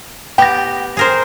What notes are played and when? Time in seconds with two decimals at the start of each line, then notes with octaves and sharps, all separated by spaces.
0.38 B3 G4 G5 A#6
0.97 G#4 A#4 C5